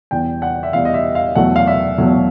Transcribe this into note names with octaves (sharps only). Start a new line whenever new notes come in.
E2 B2 G3 G5
F#5
E5
E2 B2 G3 F5
D#5
E5
F5
E2 B2 F#3 A3 F#5
F5
E5
E2 B2 F#3 A3